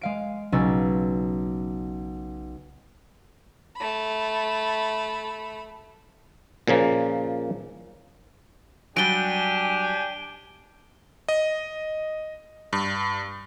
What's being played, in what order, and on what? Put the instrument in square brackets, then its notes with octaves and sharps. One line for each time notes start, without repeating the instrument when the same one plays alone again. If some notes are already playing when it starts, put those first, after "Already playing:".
[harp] G#3 F5 D7
B1 C#3 C#4 E6 A6
[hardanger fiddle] A3 B5
[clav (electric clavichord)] A#2 C#3 F3 A#3
[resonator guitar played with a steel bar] F#3 G3 [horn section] D4 G4 [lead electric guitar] G#5 [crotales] D7 G7
[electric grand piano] D#5
G2